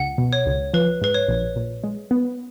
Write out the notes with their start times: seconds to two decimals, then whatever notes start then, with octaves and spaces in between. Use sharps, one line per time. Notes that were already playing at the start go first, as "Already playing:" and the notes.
Already playing: C#2 F#5
0.18 B2
0.33 C#5
0.46 C#2
0.74 F3 B4
1.01 G#2 B4
1.14 C#5
1.28 A#1
1.56 A#2
1.84 G#3
2.11 B3